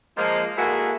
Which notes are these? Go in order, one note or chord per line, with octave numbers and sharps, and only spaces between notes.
F3 G#3 A#3
G#3 A#3 E4 F#4 G#4 A4